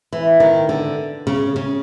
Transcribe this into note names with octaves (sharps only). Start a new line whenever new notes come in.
E3
D#3
D3
C#3
C#3